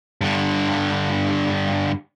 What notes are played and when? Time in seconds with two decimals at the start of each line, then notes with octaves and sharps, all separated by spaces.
0.21 G2 D3